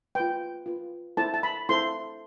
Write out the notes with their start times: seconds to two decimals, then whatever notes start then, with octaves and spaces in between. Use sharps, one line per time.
0.15 F4 B4 G5
0.66 F4 B4
1.17 E4 A4 C5 A5
1.34 A5
1.43 B5
1.69 E4 A4 C5 C6